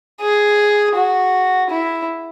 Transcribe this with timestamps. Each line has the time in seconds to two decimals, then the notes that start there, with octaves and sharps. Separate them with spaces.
0.21 G#4
0.95 F#4
1.70 E4